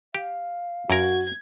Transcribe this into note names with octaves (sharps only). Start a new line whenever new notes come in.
G4 F5
F#2 F#4 A#4 G#6